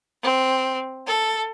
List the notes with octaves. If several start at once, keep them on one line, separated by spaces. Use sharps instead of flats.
C4
A4